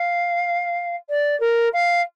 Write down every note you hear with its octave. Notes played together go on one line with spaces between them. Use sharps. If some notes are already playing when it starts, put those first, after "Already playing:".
Already playing: F5
D5
A#4
F5